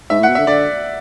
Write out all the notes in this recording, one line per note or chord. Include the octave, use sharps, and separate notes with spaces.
G#2 E5
A2 F#5
B2
D3 E5
D3 D5